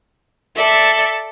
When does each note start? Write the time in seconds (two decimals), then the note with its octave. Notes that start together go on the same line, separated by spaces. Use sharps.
0.56 A4 D5 E5